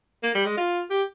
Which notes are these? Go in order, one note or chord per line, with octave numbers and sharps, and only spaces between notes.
A#3
G3
G#3
F4
G4